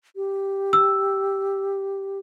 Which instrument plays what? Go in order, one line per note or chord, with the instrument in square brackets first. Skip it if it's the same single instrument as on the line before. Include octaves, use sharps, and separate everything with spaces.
[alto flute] G4
[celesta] E6